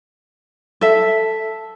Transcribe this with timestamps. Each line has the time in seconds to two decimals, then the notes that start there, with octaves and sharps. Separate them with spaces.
0.81 A4 E5